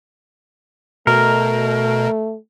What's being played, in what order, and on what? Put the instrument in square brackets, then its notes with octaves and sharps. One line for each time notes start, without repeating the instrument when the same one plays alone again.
[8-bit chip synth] B2 [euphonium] A3 [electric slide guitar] A#4